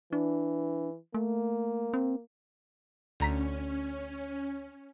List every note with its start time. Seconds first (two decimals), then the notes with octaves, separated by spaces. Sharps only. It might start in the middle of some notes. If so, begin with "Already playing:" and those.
0.13 E3 D4
1.14 A3 A#3
1.94 C4
3.20 D2 C#4 A#5 B6